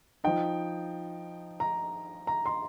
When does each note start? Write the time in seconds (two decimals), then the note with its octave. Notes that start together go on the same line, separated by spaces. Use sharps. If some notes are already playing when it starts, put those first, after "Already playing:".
0.24 F3 D#4 G5
1.60 A#5
2.27 A#5
2.46 C6